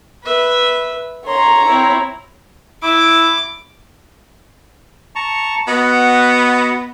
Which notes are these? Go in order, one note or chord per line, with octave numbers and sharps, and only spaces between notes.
B4 E5
C#5 A#5 C6
C4 E4
E4 D6
A5 A#5 C#6
B3 F#4 D#5 F#5